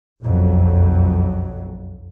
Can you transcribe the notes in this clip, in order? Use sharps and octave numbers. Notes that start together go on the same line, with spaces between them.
F#1 B1 F2 F#3